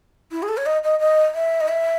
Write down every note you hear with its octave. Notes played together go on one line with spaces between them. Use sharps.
E4
G#4
A4
C#5
D#5
D#5
D#5
E5
D#5
E5